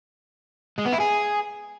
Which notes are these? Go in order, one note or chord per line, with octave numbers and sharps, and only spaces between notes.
G#3
B3
E4
G#4